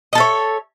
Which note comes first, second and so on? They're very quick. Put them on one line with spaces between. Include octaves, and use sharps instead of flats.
D#5 A4 E5 C#5